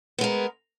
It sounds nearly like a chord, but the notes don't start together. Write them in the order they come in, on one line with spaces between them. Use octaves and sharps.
B3 G#3 A#4